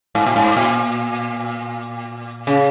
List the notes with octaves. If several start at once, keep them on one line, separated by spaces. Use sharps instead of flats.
G#2
A#2
G#2
A#2
C#3